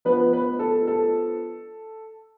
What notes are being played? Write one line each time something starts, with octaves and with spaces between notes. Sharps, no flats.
F3 B3 D4 B4
B4
A4
A4